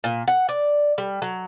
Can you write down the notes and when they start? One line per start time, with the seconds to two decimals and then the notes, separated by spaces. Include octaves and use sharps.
0.04 A#2
0.28 F#5
0.49 D5
0.98 G3
1.22 F#3